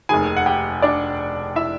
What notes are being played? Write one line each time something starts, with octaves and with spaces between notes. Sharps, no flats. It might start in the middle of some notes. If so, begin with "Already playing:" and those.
F1 D#2 D#3 G#4 G#5
F#5
G4 G5
D4 D5
E4 E5